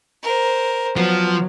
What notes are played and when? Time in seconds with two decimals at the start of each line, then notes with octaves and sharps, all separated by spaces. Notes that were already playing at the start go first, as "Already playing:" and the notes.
0.23 A#4 C5
0.97 F3 F#3 B3